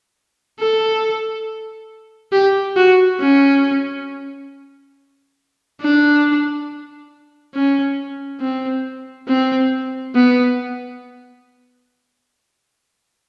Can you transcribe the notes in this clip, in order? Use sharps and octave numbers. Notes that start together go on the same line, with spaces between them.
A4
G4
F#4
C#4
D4
C#4
C4
C4
B3